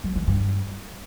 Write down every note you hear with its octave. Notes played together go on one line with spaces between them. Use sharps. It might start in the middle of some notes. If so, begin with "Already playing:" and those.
F#3
E3
G2